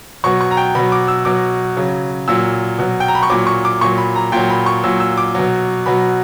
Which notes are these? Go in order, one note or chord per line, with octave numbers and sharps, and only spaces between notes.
B2 F#3 C#6
C#6
A#5
G5
B2 F#3 B5
D6
E6
B2 F#3 D6
C#3 F#3
A#2 F#3 E6
B2 F#3
G5
A#5
B5
C#6
A#2 F#3 D6
C#6
D6
A#2 F#3 C#6
B5
A#5
A#2 F#3 G5
B5
C#6
A#2 F#3 E6
E6
D6
B2 F#3
B2 F#3 B5